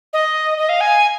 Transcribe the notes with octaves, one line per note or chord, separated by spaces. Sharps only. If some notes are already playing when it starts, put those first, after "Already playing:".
D#5
D#5
F5
G#5